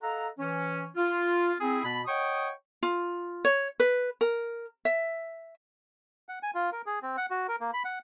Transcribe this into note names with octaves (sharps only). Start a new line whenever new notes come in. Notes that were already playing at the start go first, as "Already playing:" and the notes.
A4 D#5 F5 F#5 A#5
E3 C#4
F4
C4 E4 G#4
B2 B3 A5 B5
C#5 D#5 F#5 G5 C#6 D#6
F4
C#5
B4
A#4
E5
F#5
G#5
F4
A#4
G#4
C4
F#5
F#4
A#4
A#3
B5
F#5